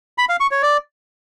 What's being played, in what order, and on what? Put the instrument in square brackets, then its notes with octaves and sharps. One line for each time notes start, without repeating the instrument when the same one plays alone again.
[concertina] B5
F5
C#6
C#5
D5